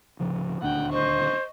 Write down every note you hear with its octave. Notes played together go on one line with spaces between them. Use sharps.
D1 C#3 F3
D#1 D2 D4 F#5 G5
C5 D#5 C#6